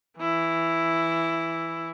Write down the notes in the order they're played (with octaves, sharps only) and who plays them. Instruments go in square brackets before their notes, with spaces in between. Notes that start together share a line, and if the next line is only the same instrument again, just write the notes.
[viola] E3 E4